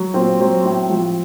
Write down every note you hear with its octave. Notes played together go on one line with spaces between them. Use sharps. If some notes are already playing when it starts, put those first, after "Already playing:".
Already playing: F#3
A#2 C4
F#3 C4
A2
F3